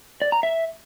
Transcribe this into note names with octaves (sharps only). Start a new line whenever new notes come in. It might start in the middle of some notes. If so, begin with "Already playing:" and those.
D5
A#5
E5